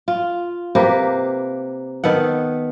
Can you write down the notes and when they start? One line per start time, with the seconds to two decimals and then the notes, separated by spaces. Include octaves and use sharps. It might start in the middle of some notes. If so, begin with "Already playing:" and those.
0.08 F4
0.75 C3 A#3 G4 B4
2.04 D#3 B3 A4 F#5